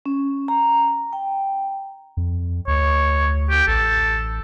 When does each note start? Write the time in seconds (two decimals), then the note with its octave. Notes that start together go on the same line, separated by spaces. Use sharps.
0.06 C#4
0.48 A#5
1.13 G5
2.17 F2
2.67 D2 C#5
3.50 G4
3.67 A1 A4